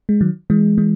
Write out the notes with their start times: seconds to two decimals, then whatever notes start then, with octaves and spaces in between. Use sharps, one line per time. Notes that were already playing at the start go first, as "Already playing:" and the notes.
0.09 G#3
0.21 D#3 F#3
0.50 E3 G#3
0.78 E3 G#3